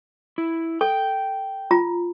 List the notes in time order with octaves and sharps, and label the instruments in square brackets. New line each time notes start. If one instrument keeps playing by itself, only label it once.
[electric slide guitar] E4
[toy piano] A4 [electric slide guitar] G5
[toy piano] F4 A#5